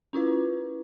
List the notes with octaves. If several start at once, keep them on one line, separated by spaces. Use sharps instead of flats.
C#4 E4 F4 B4